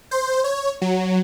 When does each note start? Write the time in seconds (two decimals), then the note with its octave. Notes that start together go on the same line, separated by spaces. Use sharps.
0.11 C5
0.44 C#5
0.82 F#3